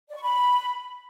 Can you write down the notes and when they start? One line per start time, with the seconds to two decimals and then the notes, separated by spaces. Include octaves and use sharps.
0.09 D5
0.16 C#6
0.22 B5